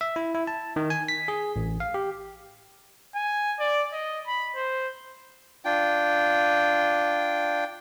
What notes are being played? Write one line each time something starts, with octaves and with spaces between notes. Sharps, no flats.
E5
E4
E4
A5
D#3
G#5
B6
G#4
A1
F5
G4
G#5
D5
D#5
B5
C5
D4 F4 G5